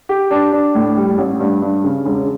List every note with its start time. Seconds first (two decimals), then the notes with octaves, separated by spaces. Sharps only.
0.09 G4
0.31 D4
0.52 D4
0.75 A2
0.97 G3
1.18 A1
1.40 G2
1.62 G2
1.84 C#3
2.05 E1